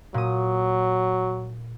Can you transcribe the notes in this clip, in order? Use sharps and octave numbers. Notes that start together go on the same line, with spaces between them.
A#2 F#3 D#6